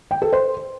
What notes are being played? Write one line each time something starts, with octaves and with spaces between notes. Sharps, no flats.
G5
A4
C5